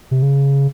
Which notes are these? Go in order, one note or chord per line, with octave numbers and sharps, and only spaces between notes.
C3
C#3